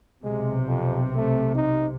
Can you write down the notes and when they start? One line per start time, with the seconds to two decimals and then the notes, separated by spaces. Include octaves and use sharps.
0.24 B1 C3 G#3
0.68 F2
1.16 A3
1.55 D#4